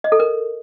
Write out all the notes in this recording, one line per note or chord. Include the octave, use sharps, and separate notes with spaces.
D#5
A4
A#4